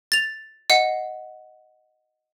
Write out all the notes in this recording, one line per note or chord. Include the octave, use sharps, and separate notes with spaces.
A6 F7
D#5 F#5 C7